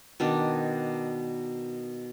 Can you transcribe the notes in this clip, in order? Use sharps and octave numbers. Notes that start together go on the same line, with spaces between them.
B2 D#3 D4